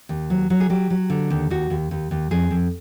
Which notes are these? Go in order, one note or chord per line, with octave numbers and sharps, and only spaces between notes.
D#2
F#3
F#3
G#4
F#3 G4
F#3
D3
D#2
D#2 F#4
D#2
D#2
D#2
F2 G#4
F2